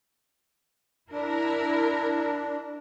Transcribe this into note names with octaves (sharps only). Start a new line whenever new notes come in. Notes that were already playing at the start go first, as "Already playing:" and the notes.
D4 E4 A#4